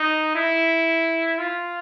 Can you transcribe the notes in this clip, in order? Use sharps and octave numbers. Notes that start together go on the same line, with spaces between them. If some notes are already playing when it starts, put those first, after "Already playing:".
Already playing: D#4
E4
F4